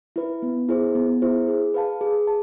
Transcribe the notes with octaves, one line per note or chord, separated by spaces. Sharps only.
E4 B4
B3
E4 G#4 C5
B3
E4 G#4 C5
G#4
B4 F5 A5
G#4
A5